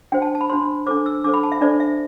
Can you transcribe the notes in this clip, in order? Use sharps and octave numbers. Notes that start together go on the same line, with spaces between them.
D4 F#4 C5 G5
A5
A5
B5
D4 F#4 C5 C6
D4 A4 C5 D6
E6
D4 A4 C5 D6
B5
A5
E5
D4 A4 C5 D5
E5